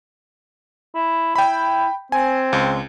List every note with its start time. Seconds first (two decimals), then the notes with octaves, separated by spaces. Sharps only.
0.95 E4
1.36 E4 G5 B5
2.12 C4 G#5
2.53 C#2